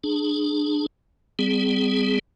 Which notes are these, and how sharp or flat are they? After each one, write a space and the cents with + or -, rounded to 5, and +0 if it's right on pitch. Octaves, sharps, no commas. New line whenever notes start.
D4 +25 G#4 +10
G3 +0 C4 -40 G#4 +0